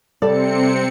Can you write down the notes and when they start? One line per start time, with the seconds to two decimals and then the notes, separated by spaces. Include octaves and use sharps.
0.22 C3 G3 C4 A4 D5 C#7